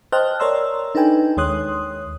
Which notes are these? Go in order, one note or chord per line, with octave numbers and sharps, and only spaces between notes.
C5 D#5 G5 A5 F6 F#6
A#4 C#5 D5 A#5 C6 E6
D4 D#4 A4 B4 G5 G#5
D#2 G#3 C#5 C6 D#6 F#6